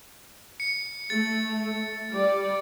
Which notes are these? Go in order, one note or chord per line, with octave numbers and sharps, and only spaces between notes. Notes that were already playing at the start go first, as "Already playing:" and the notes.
C#7
A3 A6
G3 D5